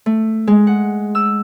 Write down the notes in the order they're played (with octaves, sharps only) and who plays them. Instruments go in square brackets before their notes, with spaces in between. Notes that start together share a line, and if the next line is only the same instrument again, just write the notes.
[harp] A3
G#3
F#5
E6